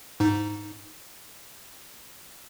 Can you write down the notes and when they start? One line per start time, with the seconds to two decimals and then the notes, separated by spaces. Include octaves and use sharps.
0.20 G#2 D#4